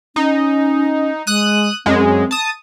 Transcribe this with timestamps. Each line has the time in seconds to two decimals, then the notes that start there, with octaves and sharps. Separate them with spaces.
0.16 C#4 D#4
1.27 G#3 D#6 F#6 D#7
1.86 F#2 G#3 C4
2.31 A5 D#6